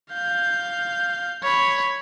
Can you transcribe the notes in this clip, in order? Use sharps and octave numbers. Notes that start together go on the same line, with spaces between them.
F5 G6
C#5 B5